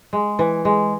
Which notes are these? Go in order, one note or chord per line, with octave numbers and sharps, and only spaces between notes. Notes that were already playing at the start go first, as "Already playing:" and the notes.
G#3
E3
G#3